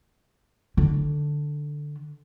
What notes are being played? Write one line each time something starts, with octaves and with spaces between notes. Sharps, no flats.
D3